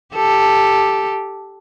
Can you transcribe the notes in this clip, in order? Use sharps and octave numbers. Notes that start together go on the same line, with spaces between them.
G4 A4